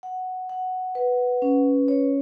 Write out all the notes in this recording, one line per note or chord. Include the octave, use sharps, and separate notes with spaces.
F#5
F#5
B4
C#4
C#5